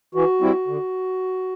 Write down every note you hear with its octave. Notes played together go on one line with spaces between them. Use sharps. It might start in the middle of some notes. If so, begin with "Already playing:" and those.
E3 F#4
G3 C4 E4
D3